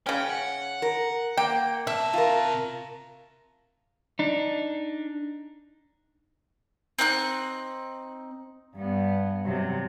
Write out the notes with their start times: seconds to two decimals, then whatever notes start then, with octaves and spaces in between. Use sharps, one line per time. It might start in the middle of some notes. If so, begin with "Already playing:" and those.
0.07 C#3 C#4 G5
0.30 F#5
0.82 A#4
1.37 A#3 G5
1.87 C3 E5 A5
2.13 F4 A#4
4.19 D4 D#4
6.99 C4 D#4 F#5 F#6
8.76 G2 B3
9.45 C3 F#3